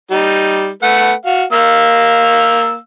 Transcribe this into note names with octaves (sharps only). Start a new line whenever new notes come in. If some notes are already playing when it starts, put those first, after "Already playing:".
G3 D#4
A3 B4 F#5
F#4 F5
A#3 F5 E6